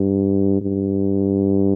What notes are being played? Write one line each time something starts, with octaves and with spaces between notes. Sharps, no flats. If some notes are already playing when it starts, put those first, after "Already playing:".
Already playing: G2
G2